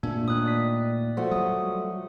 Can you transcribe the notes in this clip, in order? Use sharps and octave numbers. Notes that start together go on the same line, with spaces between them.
A#2 A3 D4
D#2 D#6 F#6
D5 B6
F3 A3 F#4
F#3 G3 D#6